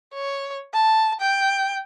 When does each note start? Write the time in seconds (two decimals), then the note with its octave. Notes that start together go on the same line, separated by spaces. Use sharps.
0.14 C#5
0.73 A5
1.20 G5